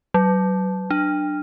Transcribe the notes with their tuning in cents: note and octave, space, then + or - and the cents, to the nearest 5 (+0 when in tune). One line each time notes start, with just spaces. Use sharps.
F#3 +25
D4 +25